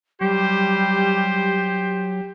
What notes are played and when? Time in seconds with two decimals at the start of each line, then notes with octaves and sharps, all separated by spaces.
0.21 F#3 G3 G4 C5